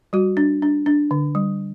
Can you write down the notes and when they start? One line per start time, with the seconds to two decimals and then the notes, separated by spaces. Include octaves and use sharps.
0.13 G3 F#4
0.37 D4
0.62 D4
0.86 D4
1.11 D3
1.35 G3